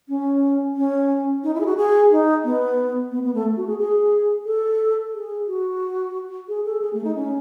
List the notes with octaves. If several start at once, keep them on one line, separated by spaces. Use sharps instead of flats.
C#4
C#4
D#4
E4
G#4
F#4
G#4
D#4
B3
B3
B3
A3
F#4
G#4
G#4
A4
G#4
F#4
G#4
A4
G#4
A3
D#4
C#4